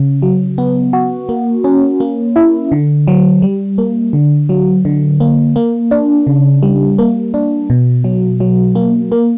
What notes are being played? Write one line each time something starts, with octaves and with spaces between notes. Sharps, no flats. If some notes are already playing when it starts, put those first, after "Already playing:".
Already playing: C#3
F#3
B3
F#4
A#3
C#4
A#3
E4
D3
F#3
G3
A#3
D3
F#3
D3
A#3
A#3
D4
C#3
G3
A#3
D4
B2
F#3
F#3
A#3
A#3